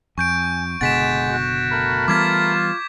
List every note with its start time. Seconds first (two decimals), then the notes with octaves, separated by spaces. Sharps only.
0.18 F2 G#5 C#6 G6 D7
0.81 F#1 B2 D3 G#3 F#5 A6 B6 E7
1.30 F#4
1.71 A3 A#4 B5
2.08 E3 G3 B3 F4 D6 G#6 B6